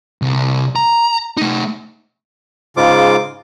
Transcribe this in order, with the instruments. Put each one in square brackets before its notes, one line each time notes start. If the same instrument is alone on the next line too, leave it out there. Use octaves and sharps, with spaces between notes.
[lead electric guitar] C2
A#5
A3 D#4
[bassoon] G#2 [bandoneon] C#3 F4 D6